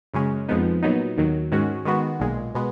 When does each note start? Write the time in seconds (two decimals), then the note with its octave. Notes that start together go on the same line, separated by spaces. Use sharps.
0.13 F#2 C#3 G#3 C#4
0.49 F2 F3 G#3 B3 D#4
0.83 A#2 F#3 B3 D#4
1.17 D#2 D#3 F#3
1.52 G#2 D#3 G#3 C#4 F#4
1.85 D#3 G#3 B3 F#4
2.20 B1 A#2 G#3
2.55 B2 G#3 B3